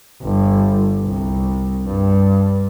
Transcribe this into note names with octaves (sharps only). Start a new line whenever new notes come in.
G1
C2
G2